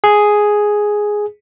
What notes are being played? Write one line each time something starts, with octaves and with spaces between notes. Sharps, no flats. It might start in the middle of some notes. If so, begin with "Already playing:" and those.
G#4